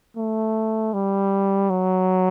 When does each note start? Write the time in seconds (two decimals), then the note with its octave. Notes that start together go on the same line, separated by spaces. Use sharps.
0.17 A3
0.94 G3
1.70 F#3